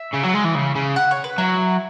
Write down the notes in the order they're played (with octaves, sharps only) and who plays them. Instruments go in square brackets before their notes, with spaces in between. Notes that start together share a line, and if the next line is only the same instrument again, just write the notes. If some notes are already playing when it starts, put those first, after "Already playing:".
Already playing: [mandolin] E5
[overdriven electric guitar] C#3
F#3
G#3
E3
C#3
C#3
[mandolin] F#5
C#5
B4
[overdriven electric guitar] F#3 [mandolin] E4